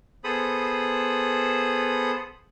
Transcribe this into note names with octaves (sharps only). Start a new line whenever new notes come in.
B3 G#4 A4 C5 B5 D#6